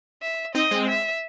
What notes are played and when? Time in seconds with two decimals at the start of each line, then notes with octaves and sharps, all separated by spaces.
0.22 E5
0.55 C4 D#4 D#5
0.71 G#3 C4
0.89 E5